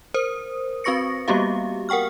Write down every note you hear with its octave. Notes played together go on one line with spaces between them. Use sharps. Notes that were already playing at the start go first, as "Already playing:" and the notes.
A#4 C5 D#6
C4 F#4 B4 C#6 A#6 C#7
G3 A#3 B3 F#4 G4 F5
A#4 F#5 G5 C#6 F6